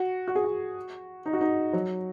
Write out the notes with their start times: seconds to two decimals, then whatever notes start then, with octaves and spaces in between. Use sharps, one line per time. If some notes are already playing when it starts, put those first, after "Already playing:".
Already playing: F#4
0.28 F#4
0.36 G#4
0.44 F#4
1.26 D#4
1.33 F#4
1.41 D#4
1.73 F#3